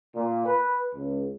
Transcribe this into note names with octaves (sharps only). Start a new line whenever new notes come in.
A#2
B4
C#2